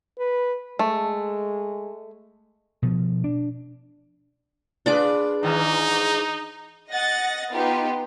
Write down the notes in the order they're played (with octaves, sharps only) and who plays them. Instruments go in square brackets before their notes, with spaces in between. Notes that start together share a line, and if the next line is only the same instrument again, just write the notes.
[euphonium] B4
[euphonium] G#3 [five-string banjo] A3
[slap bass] B2 F3
D4
[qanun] D4 D5 D6 [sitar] F4 G#4 B4
[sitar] G#2 D#3 E3 [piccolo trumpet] D#4
[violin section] D#5 F#5 A6 A#6
B3 D#4 F4 G4 B4